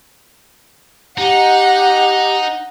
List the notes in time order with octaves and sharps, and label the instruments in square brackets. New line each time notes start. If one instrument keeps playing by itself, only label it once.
[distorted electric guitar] D#4 [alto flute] G4 [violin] F#5